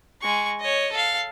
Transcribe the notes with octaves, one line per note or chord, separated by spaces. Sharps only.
G#3 C#6
C#5 D#5
A4 F5